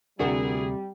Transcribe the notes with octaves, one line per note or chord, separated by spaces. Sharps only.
D2 C3 G3 D4 E4 F#4 G#4 A#4